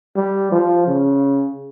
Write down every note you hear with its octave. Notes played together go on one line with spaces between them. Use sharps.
G3
F3
C#3